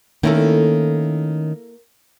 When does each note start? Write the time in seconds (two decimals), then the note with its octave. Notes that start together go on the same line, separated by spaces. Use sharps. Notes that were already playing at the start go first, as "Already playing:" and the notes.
0.23 D#3 A3 A#3 C#4 E4 A4